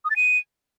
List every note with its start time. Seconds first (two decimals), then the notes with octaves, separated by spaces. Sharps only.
0.05 D#6
0.10 A6
0.16 D#7